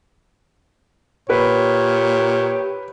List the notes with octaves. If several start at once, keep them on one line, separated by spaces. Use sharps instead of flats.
A#2 G4 B4 C#5